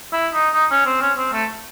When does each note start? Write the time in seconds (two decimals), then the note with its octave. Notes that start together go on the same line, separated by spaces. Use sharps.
0.13 E4
0.34 D#4
0.54 D#4
0.71 C#4
0.86 C4
1.01 C#4
1.18 C4
1.33 A3